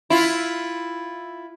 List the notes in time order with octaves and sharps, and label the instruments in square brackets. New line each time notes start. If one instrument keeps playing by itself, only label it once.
[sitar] E4 F4